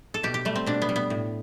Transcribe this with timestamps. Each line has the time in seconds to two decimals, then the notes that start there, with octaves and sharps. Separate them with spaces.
0.14 A4
0.23 B2 G4
0.34 G4
0.45 G3 A3
0.56 C4
0.66 B2 D4
0.82 B3
0.89 G3
0.96 B3
1.10 A2